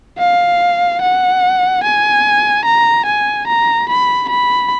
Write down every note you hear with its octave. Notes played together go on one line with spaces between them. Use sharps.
F5
F#5
G#5
A#5
G#5
A#5
B5
B5